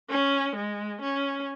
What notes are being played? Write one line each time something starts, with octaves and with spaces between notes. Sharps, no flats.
C#4
G#3
C#4